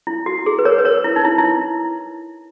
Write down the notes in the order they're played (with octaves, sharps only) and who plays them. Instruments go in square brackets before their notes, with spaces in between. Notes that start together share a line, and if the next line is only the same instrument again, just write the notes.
[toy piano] E4
F#4
G#4
B4
A#4 C#5
B4
A#4 C#5
E4
D#4
E4
E4